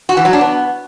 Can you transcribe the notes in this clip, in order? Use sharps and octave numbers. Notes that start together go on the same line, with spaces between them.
F#4
E3
F#3
D4
B3